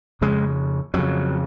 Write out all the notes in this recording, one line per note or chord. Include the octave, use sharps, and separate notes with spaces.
F2 C#3 G#3
F2 C#3 F#3